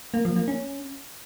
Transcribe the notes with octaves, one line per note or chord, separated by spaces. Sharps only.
A#3
F3
A#3
C#4